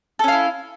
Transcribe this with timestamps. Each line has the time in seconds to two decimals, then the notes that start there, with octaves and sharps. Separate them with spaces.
0.19 A4
0.24 C#4
0.28 F5
0.32 E4